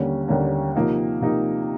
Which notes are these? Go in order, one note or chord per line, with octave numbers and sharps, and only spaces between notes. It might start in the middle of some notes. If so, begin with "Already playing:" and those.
Already playing: D#2 D3 G3 A#3 C#4
D#2 D3 G3 A#3 C#4
C3 F3 A#3 D#4
C3 F3 A#3 D#4